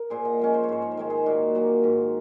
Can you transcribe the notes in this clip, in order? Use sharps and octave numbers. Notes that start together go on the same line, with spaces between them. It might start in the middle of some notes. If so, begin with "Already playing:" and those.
Already playing: A#4
A#2 G#4 C5
D#5 F#5
F3 G#3 C#4
C5
C#5
G#2 C5
C#5
C5
D#3 G#3 C#5
G#4 C5
A#2 F#4 A#4
F#3 A#3
G#2